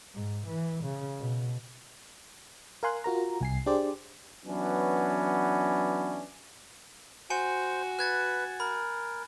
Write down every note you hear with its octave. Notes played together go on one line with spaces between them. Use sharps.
G#2
E3
C#3
B2
A#4 F5 G#5 C6 F#6
F4 F#4 A#4 A#5
C2 G#5 C7
D4 G4 G#4 C5 D5
E3 F#3 B3 C#4 D4
F#4 C5 G#5 C#7
B4 F#6 G#6 A6
A#4 B5